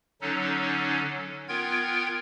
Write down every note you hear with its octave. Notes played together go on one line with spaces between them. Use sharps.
D3 F#3 C#4 D#4 A4
B3 F4 A#4 G5 G#6